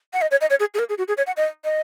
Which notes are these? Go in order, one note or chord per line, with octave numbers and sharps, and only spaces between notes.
F#5
D#5
C#5
D#5
C#5
G#4
G#4
A#4
G#4
F#4
G#4
C#5
F#5
D#5
D#5